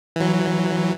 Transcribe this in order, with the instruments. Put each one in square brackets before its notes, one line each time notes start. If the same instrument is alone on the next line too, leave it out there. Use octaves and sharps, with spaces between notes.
[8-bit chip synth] E3 F#3